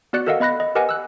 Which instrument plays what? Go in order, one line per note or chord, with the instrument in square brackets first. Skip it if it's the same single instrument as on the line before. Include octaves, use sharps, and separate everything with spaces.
[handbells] B3 F#4 D5 F#6 C#7
F#4 A4 A#4 D#5 F5 F#5
B3 D#5 B5 F#6 A#6
D#5
G4 A#4 B4 D#5 F#5 G#5
E6 F#6